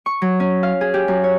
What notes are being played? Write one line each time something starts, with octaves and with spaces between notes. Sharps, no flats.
C#6
F#3
C#4
F5
G#4
G4
F#2
C#5